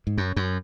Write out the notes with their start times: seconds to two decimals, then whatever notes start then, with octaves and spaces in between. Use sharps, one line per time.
0.07 G#2
0.18 F#2
0.36 F#2